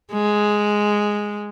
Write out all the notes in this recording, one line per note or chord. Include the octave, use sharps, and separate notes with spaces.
G#3